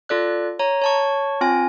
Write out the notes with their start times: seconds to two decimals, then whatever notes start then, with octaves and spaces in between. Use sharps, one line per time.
0.09 F4 A4 D5 F#6
0.59 C#5 A#5
0.82 C#5 A5 C#6
1.41 C4 F4 G#5